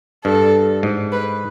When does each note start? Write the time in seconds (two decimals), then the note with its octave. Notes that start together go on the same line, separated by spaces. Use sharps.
0.25 G2 A4
0.83 G#2
1.12 B4